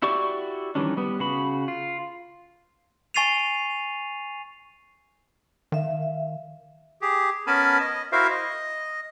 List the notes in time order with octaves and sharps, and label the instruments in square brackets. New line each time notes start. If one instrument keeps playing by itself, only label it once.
[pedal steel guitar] E4 F#4 G4 D5 C#6
D#3 E3 G3 C#4 D4
G3 B3
C#3 F#4 B5
F4
[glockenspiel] G#5 C#6 A6 C7 D#7 F7
[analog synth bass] D#3 [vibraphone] E5 F5
[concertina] G4 G#4
B3 C#4 A#4 G#5 A5 B5
D#5
E4 F#4 A#4 C5 E5 F5
D#5